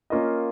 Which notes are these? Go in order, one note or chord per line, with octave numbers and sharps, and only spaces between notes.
A#3 C#4 F4 A#4 D#5